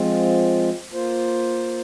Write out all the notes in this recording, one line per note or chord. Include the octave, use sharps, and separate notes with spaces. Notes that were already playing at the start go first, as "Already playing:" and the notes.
Already playing: F3 G#3 C4 F4
A#3 F4 C5